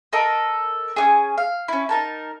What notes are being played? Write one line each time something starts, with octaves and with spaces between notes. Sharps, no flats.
A4 A#4 D#5
C#4 D4 G#4
F5
C#4 E4
D#4 A#4 A5